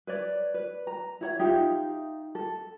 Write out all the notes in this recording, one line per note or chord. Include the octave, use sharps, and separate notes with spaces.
B4 C#5 D5
B4
A#5
E4 C#5 F#5
D#4 F4 G4 E5
A4